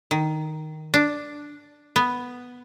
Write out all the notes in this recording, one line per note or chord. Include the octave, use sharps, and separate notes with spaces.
D#3
D4
B3